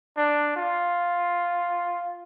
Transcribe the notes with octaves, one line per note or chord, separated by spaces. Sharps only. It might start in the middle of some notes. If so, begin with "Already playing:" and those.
D4
F4